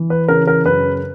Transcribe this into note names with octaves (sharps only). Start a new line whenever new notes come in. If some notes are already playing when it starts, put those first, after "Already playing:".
Already playing: E3
B4
C#3 A#4
A#4
F#2 B4